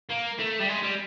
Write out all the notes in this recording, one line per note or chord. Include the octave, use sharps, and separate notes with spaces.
A#3
A3
G3
G#3
G3